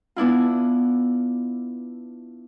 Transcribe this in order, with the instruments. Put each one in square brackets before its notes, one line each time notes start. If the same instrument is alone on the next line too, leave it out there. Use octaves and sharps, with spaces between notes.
[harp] B3 D4 E4 F4